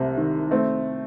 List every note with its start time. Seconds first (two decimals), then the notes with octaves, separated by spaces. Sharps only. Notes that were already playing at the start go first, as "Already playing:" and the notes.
Already playing: C2 C3
0.17 D#3
0.51 A3 C4